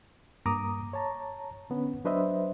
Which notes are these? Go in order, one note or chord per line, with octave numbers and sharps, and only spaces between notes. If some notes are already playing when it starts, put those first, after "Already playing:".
G2 A#3 A#5 D6 D#6
C#5 A5 A#5
D3 B3 C#4
F#3 D4 B4 C5 D#5 E5